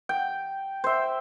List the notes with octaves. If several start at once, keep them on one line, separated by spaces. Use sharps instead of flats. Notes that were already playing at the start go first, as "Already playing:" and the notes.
G5
C5 E5